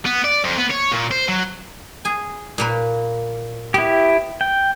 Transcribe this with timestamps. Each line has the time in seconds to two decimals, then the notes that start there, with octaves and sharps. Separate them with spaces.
0.05 B3
0.25 D5
0.45 F2
0.58 B3
0.71 C#5
0.92 A#2
1.11 C5
1.28 F#3
2.05 G#4 G#5
2.58 A#2 A#3 B4
3.74 B3 E4 G4
4.41 G5